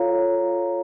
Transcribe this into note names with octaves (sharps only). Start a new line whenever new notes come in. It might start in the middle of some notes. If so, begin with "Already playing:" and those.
Already playing: F4 A4 C#5 F5 A#5